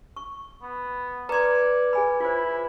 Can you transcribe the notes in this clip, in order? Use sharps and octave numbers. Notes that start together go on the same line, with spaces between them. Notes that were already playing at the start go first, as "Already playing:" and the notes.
C#6
B3
B4 D5 A#5 C6 G#6
G#4 G#5 B5
E4 F4 C5